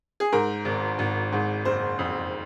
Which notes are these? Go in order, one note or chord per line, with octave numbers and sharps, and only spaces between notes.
G#4
G#2 A#4
G#1
G#1
G#2
F#1 C5
F2 C5